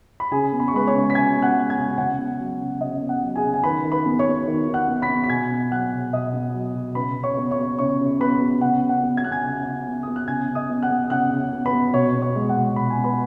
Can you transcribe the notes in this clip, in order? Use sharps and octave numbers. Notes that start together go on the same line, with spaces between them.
B5
C#3 G#4 G#5
B3
B5
C#6
G#3 B4 B5
C#5 C#6
C#3
B6
C#3 G#5 G#6
B3
F#5 F#6
G#3
G#5 G#6
C#3
C#3 F#5
B3
F#3
C#3
C#3 D#5
B3
F#5
F#3
G#4 G#5
C#3
G#5
D#3 B4 B5
D#3
B4 B5
B3
C#5 C#6
B3
D#3
D#3
F#5 F#6
B3
B5 B6
B3
B6
B2 G#5 G#6
B3
F#3 F#5 F#6
B2
B2 D#5 D#6
B3
F#3
B2
C#3 B4 B5
C#3
C#5 C#6
B3
C#5 C#6
B3
C#3 C#5 C#6
C#3
B3 B4 B5
B3
C#3 F#5
C#3
F#5
B3
G#6
B3 F#6
G#5 G#6
C#3
C#3
B3
B3 D#6
F#6
C#3 G#5 G#6
C#3
D#5 D#6
B3
F#5 F#6
B3
C#3 F#5 F#6
C#3
B3
B4 B5
B3
B2 C#5 C#6
B3
C#5 C#6
G#3
F#5
B2
B2 B5
G#5
B3
B4 B5